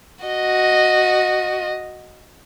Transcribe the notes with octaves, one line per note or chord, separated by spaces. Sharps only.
F#4 D#5